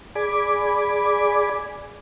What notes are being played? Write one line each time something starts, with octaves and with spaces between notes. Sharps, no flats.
G#4 D5 G#5 B5 D6